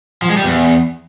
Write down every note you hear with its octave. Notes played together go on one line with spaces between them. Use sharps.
F3
G#3
G3
E2